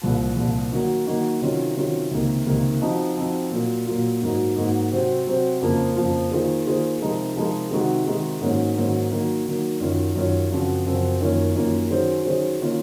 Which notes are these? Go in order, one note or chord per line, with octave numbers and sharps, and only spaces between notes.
C2 A#2 F3
C2 A#2 F3
D#3 F#3 A#3 D#4 F#4
D#3 F#3 A#3 D#4 F#4
C3 D#3 F#3 C#4 F4
C3 D#3 F#3 C#4 F4
C#2 C3 D#3 A#3
C#2 C3 D#3 A#3
F3 C4 D#4 F#4
F3 C4 D#4 F#4
A#2 F#3 A#3 F4
A#2 F#3 A#3 F4
G#2 F#3 A#3 D#4 F#4
G#2 F#3 A#3 D#4 F#4
C3 F#3 C4 F#4 C5
C3 F#3 C4 F#4 C5
F2 C#3 F3 A#3 F4
F2 C#3 F3 A#3 F4
D#3 A#3 F4 G#4 C5
D#3 A#3 F4 G#4 C5
C3 F3 G#3 D#4 A#4
C3 F3 G#3 D#4 A#4
C3 D#3 G#3 D#4 F#4
C3 D#3 G#3 D#4 F#4
G#2 D#3 F#3 A#3 C#4
G#2 D#3 F#3 A#3 C#4
D#3 F#3 A#3
D#3 F#3 A#3
F#2 D#3 F#3 C#4 F4
F#2 D#3 F#3 C#4 F4
F#2 C#3 F3 C4 F#4
F#2 C#3 F3 C4 F#4
F#2 D#3 A#3 C#4 F4
F#2 D#3 A#3 C#4 F4
D#3 F#3 C#4 G#4 C5
D#3 F#3 C#4 G#4 C5
D#3 A#3 C#4 F4